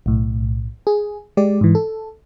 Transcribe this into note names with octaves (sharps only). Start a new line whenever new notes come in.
B1 A2
G#4
G#3 G4 D5
G#2 E3
A4